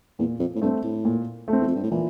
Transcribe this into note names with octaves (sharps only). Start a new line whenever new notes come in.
E2 A#2
F2
A2
G2 A3 C4
A2
A#2
A3
C4
E2
F2
G2
A2
A#2 E3